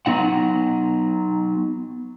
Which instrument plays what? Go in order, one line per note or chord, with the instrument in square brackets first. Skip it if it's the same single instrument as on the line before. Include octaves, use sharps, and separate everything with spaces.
[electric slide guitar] F#3 B3 D#4 F#5